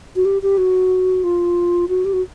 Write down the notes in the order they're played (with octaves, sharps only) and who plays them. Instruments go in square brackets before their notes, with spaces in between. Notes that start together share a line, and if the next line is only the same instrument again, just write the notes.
[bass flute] F#4
G4
G4
F#4
F4
F#4
G4
F#4